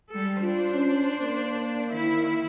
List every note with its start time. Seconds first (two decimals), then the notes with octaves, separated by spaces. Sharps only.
0.11 G3 G#3 A4
0.42 D4 F4 C5
0.75 C#4
1.21 A#3
1.90 D#3 E4